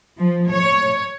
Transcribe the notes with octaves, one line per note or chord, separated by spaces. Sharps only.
F3
C#5